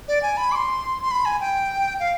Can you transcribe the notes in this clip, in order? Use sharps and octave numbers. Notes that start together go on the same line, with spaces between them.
D5
G#5
B5
D6
C6
C6
B5
G#5
G5
F5